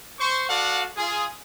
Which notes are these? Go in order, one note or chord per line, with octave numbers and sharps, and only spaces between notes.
C5 C#6
F#4 A4 D5 F5 F#5
F4 G#4